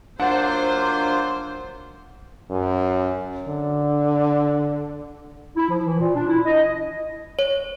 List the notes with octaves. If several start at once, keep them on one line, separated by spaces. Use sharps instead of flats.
F#3 A#3 D4 F4 C5 F#5
F#2
D3
E4
F3
E3
A#2
D4
E4
D#5
C#5